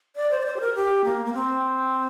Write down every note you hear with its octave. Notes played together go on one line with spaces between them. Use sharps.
D5
C5
D5
C5
G4
A#4
G4
A#3
A#3
C4